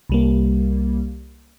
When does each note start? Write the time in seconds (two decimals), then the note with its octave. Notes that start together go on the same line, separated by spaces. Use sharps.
0.09 C2 G3 A#3